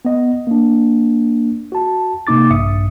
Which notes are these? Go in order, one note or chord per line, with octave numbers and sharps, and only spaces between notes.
B3 D#5
A#3 D4
F#4 A5
C3 A#3 D#4 D6 A6
A#1 G2 E5 D#6 C#7